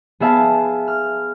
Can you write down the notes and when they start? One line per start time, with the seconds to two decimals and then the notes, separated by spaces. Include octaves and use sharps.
0.20 B3 G#4 E5 F5 A5
0.88 F6